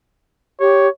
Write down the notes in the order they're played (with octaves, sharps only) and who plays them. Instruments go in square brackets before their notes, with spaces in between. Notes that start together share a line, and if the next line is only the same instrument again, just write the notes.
[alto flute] G4 [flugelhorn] C#5